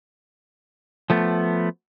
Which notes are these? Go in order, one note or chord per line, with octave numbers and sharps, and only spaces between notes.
F3 A3 B3